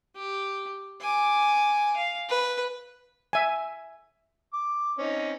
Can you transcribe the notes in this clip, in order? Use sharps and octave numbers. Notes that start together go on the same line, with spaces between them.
G4
G#5 D6
F5
B4
E5 G#5
D6
C4 C#4 D#4